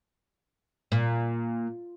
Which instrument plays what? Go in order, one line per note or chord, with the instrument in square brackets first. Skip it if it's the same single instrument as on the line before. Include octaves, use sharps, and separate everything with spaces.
[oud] A#2